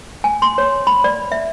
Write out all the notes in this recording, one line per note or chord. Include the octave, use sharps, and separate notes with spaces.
G#5
C6
C#5
B5
D5
E5